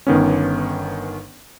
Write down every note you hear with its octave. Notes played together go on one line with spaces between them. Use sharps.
G1 D#3 B3 C#4